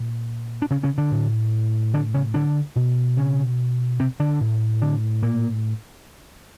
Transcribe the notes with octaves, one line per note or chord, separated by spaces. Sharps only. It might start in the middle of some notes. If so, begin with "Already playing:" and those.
Already playing: A#2
D4
C#3 C#4
C#3 C#4
D3 D4
A2
D3 D4
C#3 C#4
D3 D4
B2
C#3 C#4
C3 C4
D3 D4
A2
D3 D4
A#2 A#3